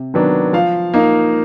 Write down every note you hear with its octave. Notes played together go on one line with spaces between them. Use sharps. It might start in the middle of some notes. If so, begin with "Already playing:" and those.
Already playing: C3
D#3 F#3 B3 D4
F3 F5
A#3 D#4